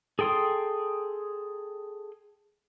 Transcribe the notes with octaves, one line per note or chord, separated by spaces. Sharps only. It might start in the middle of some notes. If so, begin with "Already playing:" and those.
G#4 A4 G5 C6 D#6